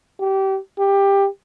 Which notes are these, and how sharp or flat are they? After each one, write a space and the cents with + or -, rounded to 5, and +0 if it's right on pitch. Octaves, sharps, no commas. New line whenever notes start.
G4 -25
G4 +15